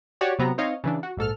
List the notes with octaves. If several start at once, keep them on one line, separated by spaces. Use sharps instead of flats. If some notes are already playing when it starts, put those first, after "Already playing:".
F#4 G4 C#5 D5
C3 F#3 B3 C4 A#5
C4 D#4 C#5 D#5 F5
C#3 E3 D4
F#4
A#1 G#2 A4 F6